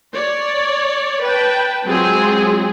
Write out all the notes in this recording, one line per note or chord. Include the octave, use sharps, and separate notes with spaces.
C#5 D5
B4 G5 A5
F#3 G#3 C4 F4 G#4